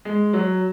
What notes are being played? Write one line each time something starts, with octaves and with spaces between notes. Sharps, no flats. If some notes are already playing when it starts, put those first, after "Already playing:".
G#3
F#3